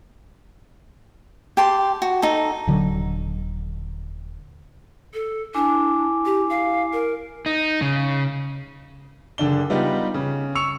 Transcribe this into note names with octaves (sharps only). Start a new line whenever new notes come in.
G4 A5 C6
F#4
D#4 A4
D#1 D3 F#3
A4
D4 E4 G#5 D6
G4
F5
A#4
D#4
C#3
F#1 D3 D4 G7
G3 B3 D#4 F4 G4
C#3
C#6 E6 C#7 F7